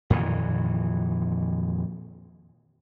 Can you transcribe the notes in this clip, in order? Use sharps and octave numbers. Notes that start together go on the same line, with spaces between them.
F2 A#2 D#3 E3